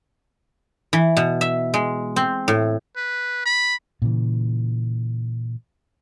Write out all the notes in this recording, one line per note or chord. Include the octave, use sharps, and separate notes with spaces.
E3
B2
E5
G#3
C4
A2
B4
B5
A#2 C#3 E3